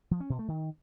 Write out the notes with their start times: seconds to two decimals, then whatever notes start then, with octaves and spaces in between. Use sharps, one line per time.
0.11 F3
0.20 C#4
0.30 B2
0.39 A3
0.48 D#3